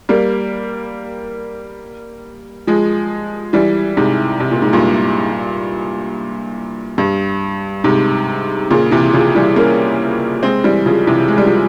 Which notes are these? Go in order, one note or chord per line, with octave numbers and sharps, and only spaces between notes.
G3 A#3
F3 G#3
E3 G3
G#2 C3
C3
A#2
G#2
G2 A#2
G2
G#2 C3
A#2 C#3
C3 E3
C#3 F3
E3 G3
A#3 C#4
G#3 C4
E3 G3
C#3 F3
C3 E3
G#3
G3
F3